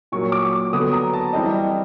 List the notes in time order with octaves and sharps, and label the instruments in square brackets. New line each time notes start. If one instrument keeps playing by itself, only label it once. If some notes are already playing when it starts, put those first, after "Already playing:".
[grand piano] A#2 F#3 A#3 C#6
D6
D6
D3 F#3 B3 D#6
A#5
A5
E3 G3 C4 D#5
D#5